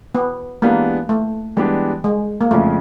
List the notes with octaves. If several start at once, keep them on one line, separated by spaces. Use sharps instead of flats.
B3
E3 G#3 A#3 B3 D4 G4
A3
E3 G3 G#3 B3 D4 G4
G#3
A#3
F2 C#3 F3 G#3 A3